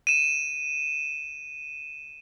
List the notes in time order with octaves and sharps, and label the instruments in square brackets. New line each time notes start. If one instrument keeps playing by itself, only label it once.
[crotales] D#7 E7